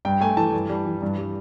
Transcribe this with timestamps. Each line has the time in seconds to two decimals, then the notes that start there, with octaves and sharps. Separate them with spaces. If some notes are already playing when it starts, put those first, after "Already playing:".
0.05 G2 G5
0.21 A3 G#5
0.37 E3 A5
0.53 G2
0.69 G3
0.86 E3
1.02 G2
1.18 G3